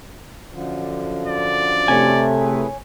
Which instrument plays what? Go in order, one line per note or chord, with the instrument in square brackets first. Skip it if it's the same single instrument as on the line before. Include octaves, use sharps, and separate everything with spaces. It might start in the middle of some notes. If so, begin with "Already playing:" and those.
[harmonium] F#2 D3 F3
[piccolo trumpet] D5
[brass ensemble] C3 A3 [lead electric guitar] C#5 G#5
[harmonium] E4 G#4 B4